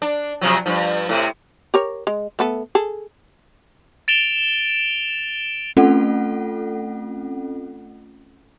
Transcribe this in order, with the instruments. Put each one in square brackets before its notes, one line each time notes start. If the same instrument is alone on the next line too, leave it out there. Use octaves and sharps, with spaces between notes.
[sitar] D4
C3 F3 F#3
G2 F3
A2 C3
[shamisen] G4 A#4 C#5
G#3
A3 B3 A4
G#4 A4
[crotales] A6 D7 E7 F7 G7
[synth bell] A3 C4 C#4 F4 A4 F#5